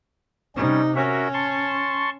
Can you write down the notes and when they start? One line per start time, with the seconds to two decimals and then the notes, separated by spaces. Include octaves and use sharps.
0.56 C3 G3 C#4 D#4
0.96 C#4 F#4 A#4 E5
1.34 A5 C6 C#6